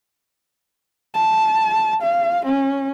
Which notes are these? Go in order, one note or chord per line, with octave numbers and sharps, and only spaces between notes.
A5
F5
C#4